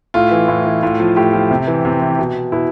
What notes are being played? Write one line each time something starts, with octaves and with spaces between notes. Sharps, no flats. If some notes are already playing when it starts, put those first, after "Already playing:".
A2 F4
E3
A2
E3
A2 F4
F3
A2 G4
F3
C3
E3
C3
E3
B2
B2 E4